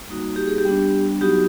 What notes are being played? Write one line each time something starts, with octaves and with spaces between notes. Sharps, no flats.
G3 A#3 D#4 F#4
G4
G#4
G4
G3 B3 D4
F#3 B3 D#4 F#4 G4